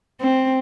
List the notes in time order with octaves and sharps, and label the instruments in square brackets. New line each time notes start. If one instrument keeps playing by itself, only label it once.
[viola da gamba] C4